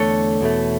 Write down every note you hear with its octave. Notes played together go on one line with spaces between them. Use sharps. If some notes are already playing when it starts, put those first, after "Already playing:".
Already playing: E2 D3 A3 A4 C#5
E2 B2 A3